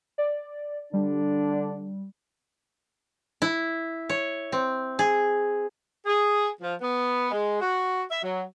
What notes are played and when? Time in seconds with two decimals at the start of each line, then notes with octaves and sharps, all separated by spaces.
0.18 D5
0.93 D3 G3 D4
3.42 E4
4.09 C#5
4.52 C4
4.99 G#4
6.06 G#4
6.61 F3
6.81 B3
7.32 G#3
7.61 F#4
8.11 E5
8.23 F#3